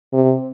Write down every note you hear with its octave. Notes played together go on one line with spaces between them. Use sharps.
C3